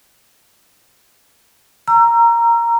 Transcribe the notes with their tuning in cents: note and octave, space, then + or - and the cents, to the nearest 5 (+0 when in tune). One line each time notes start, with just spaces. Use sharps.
A#5 +0 E6 +35